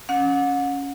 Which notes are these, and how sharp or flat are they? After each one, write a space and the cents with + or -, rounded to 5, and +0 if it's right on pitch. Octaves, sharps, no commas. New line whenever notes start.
C#4 +5 F#5 -35